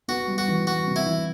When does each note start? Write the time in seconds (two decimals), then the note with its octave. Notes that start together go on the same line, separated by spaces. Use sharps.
0.08 B3 F#4
0.28 G3
0.38 F#4
0.48 E3
0.67 G3 F#4
0.87 C3
0.96 E4
1.06 E3